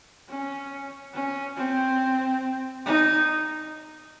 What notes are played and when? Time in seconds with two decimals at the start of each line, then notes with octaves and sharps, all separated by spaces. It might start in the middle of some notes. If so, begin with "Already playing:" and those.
0.28 C#4
1.13 C#4
1.56 C4
2.86 D#4